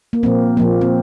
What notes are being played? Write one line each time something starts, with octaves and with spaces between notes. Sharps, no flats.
A#3
A#2 F3 A#3 C4
A#2 F3 A#3
C4